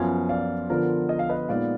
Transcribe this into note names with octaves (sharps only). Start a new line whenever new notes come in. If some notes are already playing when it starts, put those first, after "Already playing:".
Already playing: F#2 F3 B3 F4 F5 G#5
D5 F5
D3 F3 B3 F4 A#4 D5
D#5
F5
B4 D#5
A#2 G#3 B3 D#4 D5 F5